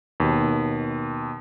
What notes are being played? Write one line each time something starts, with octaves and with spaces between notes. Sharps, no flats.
D#2 B2